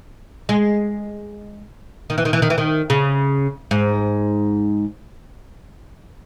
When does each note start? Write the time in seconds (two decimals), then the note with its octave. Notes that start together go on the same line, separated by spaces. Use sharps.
0.49 G#3
2.10 D#3
2.18 E3
2.25 D#3
2.33 E3
2.42 D#3
2.50 E3
2.58 D#3
2.90 C#3
3.71 G#2